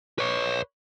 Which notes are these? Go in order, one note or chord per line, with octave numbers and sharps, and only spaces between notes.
B4 C#5